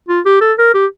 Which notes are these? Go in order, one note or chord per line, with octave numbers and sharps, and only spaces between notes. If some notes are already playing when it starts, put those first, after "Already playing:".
F4
G4
A4
A#4
G4